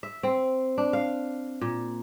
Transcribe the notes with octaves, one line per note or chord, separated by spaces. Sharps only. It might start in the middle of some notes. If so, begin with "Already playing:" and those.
E5
C4
D4
F5
A#2